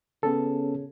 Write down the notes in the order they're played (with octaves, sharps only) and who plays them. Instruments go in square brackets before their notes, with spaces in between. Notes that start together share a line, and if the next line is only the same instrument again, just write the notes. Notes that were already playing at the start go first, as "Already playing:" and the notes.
[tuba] C#3 [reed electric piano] B3 C#4 A4